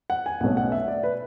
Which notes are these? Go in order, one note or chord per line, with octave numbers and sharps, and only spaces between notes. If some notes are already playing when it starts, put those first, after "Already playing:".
F#5
G#5
B1 B2 A3 C#4 F#5
F#5
E5
D5
B4